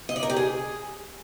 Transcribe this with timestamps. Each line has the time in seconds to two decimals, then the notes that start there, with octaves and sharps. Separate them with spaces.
0.09 D#5
0.16 D5
0.23 A#4
0.30 G4
0.36 G#4